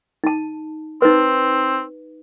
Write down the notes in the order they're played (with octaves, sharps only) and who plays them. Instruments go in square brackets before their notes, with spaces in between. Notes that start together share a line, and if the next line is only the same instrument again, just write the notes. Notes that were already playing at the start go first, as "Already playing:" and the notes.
[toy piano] D#4 A5
[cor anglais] C4 [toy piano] D#4 B4